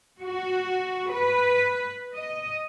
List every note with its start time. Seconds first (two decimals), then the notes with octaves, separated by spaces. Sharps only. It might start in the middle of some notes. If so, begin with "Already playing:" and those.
0.22 F#4
1.13 B4
2.15 D#5